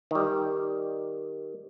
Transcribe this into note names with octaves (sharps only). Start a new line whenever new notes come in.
D#3 G3